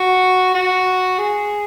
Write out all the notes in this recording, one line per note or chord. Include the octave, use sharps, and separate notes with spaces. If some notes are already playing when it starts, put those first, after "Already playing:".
Already playing: F#4
F#4
G#4